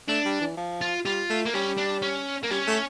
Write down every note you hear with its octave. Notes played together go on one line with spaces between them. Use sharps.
A3 D4
G3
E3
F3
F4
G3 F4
A3
A#3
G3 C#4
D4
C#4
A#3
G3 C#4
A3